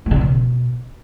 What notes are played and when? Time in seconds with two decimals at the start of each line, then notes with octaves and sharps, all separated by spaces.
0.06 A3
0.11 C#3
0.16 E3
0.21 B2